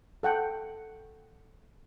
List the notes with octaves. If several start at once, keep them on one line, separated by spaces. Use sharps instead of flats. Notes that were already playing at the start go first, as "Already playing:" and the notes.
A4 F#5 G5